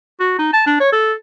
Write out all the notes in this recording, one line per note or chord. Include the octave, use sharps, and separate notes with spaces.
F#4
D#4
A5
D4
C#5
A4